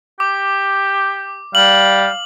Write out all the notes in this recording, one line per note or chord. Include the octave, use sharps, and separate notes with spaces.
G4 D6
G3 F5 F#7